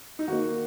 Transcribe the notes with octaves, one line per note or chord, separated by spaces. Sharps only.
D#4
D#3 A#3 F#4